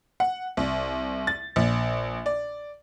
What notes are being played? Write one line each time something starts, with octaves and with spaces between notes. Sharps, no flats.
F#5
C2
A6
A#1
D5